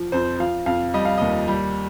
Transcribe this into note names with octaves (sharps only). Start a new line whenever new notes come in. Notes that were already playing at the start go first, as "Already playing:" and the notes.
Already playing: F3
F2 C5
F3 F5
F2 F5
G3 D#5
F5
D#2 D#5
G3